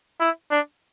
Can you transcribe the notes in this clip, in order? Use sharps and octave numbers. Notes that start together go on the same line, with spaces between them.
E4
D4